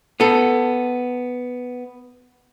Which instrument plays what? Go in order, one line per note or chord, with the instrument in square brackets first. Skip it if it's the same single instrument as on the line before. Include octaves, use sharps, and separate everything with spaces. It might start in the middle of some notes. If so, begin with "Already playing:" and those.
[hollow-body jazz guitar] B3 A4